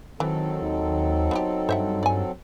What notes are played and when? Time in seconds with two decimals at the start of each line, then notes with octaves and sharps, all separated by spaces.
0.20 D#3 E3 F#3 C4 A4
0.62 D#2 D#4
1.31 B3 E4 G4
1.69 G2 C5 E5 F#5
2.03 D5 G#5